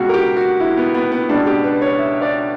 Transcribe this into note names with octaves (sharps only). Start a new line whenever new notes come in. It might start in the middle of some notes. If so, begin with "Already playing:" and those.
Already playing: C#2 B2 F#4
A#4
G4
F#4
E4
B3
B3
B3
C#2 B2 D4
G4
B4
C#5
E5
D5